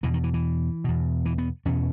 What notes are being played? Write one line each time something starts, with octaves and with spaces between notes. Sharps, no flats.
E2 B2 E3
D#3
E3
E3
E2 B2
E3
B3
E2 B2 C#4